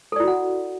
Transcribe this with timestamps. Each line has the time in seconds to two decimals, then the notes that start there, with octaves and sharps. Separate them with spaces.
0.12 A4
0.16 D5
0.20 E4
0.24 F#4
0.28 F#5